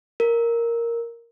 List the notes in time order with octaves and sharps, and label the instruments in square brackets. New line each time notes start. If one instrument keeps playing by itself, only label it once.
[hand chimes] A#4